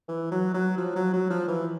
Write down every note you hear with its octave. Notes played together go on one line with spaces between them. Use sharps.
E3
F#3
F#3
F3
F#3
F#3
F3
E3